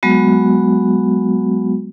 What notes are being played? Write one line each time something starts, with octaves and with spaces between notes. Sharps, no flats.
F#3 G#3 B3 F#4